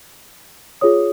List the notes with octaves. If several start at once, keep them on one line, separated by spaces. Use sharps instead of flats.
F4 G#4 C#5 D#6